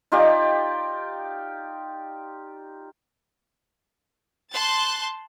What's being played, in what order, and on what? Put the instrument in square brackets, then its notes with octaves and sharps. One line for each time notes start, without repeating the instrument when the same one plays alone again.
[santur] D#4 F4 G4 D5
[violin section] A5 C6 F#6 G6 A6